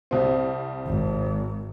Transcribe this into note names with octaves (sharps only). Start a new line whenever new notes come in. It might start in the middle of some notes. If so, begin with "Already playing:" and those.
C2 C4
G#1